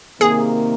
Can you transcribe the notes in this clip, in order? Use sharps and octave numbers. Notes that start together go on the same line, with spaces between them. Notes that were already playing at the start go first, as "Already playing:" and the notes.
C3 D#3 A#3 G#4